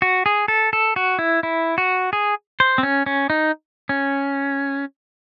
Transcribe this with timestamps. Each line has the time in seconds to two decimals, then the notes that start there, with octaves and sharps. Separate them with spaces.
0.02 F#4
0.26 G#4
0.48 A4
0.73 A4
0.96 F#4
1.19 E4
1.43 E4
1.78 F#4
2.13 G#4
2.60 C5
2.78 C4
2.83 C#4
3.06 C#4
3.30 D#4
3.89 C#4